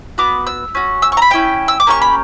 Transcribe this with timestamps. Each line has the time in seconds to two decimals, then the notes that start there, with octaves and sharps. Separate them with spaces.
0.18 B3 F#4 D6
0.47 E6
0.75 C#4 F#4
1.02 E6
1.12 C#6
1.17 A#5
1.22 B5
1.30 C#4 E4 G4 G5
1.68 E6
1.80 D6
1.87 A#3 C#4 G4 C#6
2.02 B5